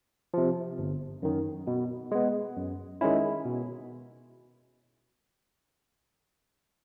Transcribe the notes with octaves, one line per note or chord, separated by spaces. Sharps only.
C3 F3
G1
F#2 D#3
B2
G#3 B3
F#2
D#3 G#3 C#4 E4
B2